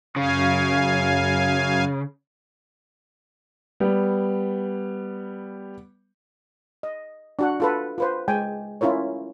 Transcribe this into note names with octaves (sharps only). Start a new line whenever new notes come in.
F#2 C#3 F5 G#5
G3 B3
D#5
D4 F#4 F#5
F4 A4 B4
F4 B4 C5
G#3 G5 G#5
C#4 E4 F4 A#4 C#5